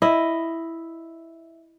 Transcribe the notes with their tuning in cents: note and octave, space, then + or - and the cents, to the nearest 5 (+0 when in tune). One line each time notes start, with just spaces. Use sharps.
E4 +0 D#5 +0